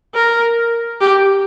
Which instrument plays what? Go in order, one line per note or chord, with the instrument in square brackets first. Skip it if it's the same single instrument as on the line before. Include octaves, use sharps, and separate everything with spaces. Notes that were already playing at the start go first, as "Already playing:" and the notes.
[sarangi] A#4
G4